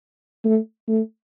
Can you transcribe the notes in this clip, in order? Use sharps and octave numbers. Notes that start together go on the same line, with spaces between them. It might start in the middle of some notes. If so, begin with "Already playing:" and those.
A3
A3